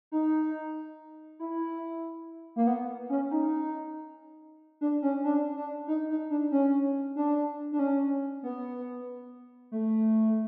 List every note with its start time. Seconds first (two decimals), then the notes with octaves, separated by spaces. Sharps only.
0.12 D#4
1.39 E4
2.56 A#3
2.67 B3
3.10 C#4
3.31 D#4
4.81 D4
5.02 C#4
5.24 D4
5.55 D4
5.87 D#4
6.09 D#4
6.30 D4
6.52 C#4
7.16 D4
7.72 D4
7.79 C#4
8.43 B3
9.72 A3